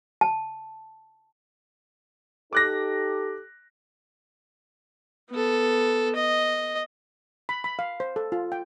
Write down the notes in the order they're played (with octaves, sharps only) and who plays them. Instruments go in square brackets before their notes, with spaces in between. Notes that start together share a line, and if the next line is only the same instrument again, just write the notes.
[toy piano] A5
[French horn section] D#4 G4 A4 [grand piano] D6 F#6 A#6
[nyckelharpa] B3 A4
D#5
[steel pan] B5
B5
F5
C5
A4
F4
G5